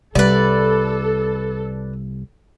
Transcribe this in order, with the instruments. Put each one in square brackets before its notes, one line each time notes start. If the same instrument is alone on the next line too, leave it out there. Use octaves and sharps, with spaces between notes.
[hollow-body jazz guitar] C2 [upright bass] G3 [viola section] A4 [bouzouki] B4 D5